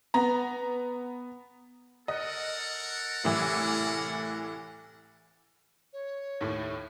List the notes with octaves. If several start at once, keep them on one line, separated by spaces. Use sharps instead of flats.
B3 A#5
A4 A#4 D#5 F#5
C2 A2 E3
C#5
D#2 A2